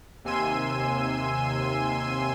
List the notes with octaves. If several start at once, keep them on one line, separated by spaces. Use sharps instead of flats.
D#2 C3 G#5 C6 E6 D#7